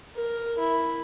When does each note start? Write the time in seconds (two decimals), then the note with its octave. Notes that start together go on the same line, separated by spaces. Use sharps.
0.16 A#4
0.59 E4